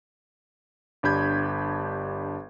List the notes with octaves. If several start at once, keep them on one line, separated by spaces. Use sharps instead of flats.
G1 D4 G4 B5 G6 G#6